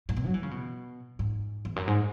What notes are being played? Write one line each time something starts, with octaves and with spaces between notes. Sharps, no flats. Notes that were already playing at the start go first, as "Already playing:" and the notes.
G#2
B2
F#3
E3
C#3
B2
G#2
E2
F#2
G#2